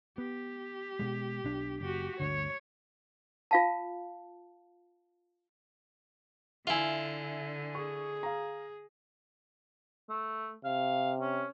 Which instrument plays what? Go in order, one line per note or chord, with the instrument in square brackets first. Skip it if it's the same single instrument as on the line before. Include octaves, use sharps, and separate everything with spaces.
[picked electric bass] B3 [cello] G4
[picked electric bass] B2 G#3
B1 D4
[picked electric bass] F#1 [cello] F#4 G4
[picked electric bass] G1 D2 D3 [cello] C#5
[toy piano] F4 F5 A5
[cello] D3 [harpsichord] E4 F4 [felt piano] E5 G#5
[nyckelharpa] G#4 [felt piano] C#6
[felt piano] F5 A#5
[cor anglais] A3
[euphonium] C3 [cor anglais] F5
[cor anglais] C#4